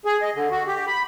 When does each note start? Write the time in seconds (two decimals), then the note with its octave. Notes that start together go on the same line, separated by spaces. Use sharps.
0.05 G#4
0.22 D#5
0.35 D3
0.51 F#4
0.67 G4
0.87 B5